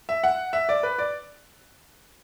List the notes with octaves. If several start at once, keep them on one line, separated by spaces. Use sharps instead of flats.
E5
F#5
E5
D5
B4
D5